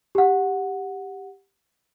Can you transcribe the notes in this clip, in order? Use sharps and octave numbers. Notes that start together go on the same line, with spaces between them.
G4 F#5